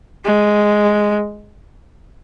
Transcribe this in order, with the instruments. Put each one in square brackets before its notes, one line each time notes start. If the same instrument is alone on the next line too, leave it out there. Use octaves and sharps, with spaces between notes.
[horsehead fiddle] G#3